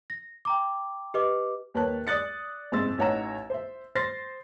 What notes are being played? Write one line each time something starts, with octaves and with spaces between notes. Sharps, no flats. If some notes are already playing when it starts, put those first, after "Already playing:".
A#6
G5 A#5 D6
G4 B4 D#5 D6
D#2 A#3 B4 C#5 A5 F#6
D5 D#6 F#6 A6 C#7
F#1 G#2 C4 C6 E6 A6
A1 D#4 C#5 F#5 A#5 E7
C5 E5
C5 C6 A6 A#6 C7